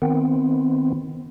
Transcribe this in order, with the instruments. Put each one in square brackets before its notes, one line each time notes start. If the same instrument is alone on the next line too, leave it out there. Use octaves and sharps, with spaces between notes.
[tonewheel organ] D#3 B3 C4